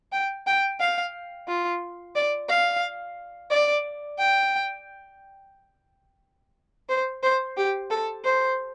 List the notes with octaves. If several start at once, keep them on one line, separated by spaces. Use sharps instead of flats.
G5
G5
F5
F4
D5
F5
D5
G5
C5
C5
G4
A4
C5